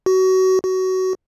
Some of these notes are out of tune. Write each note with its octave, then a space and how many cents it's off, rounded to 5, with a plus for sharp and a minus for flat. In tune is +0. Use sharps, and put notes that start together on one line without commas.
F#4 +25
F#4 +20